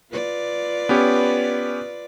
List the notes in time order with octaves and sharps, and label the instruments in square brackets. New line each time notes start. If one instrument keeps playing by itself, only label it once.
[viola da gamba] F4 B4 D5
[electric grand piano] B3 C#4 G4